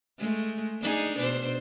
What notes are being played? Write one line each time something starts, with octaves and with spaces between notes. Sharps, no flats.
G#3 A3
D4 D#4 G#4
B2 D4 C5